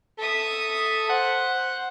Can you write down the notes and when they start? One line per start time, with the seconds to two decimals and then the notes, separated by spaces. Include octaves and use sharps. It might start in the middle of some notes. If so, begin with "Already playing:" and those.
0.19 A4 E5 D#6
1.10 C5 F#5